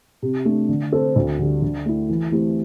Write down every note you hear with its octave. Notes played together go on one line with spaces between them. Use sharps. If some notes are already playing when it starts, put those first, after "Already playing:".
C3
A3 D4
D3
C4 A4 C5
D2
D3 G3
D3
A3 E4
E3
A3 C4 E4 G4